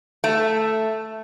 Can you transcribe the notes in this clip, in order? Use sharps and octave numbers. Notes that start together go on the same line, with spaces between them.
A3